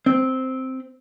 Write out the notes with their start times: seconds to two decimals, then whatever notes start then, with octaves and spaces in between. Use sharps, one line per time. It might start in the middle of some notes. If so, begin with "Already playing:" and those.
0.06 C4